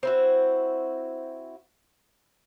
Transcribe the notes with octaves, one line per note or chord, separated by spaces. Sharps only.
C4 E4 F#4